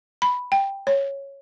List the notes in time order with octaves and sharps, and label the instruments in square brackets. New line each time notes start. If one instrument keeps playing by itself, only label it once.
[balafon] B5
G5
C#5